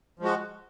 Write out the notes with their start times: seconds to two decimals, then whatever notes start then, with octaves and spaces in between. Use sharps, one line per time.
0.19 F3
0.22 G#3
0.25 F#4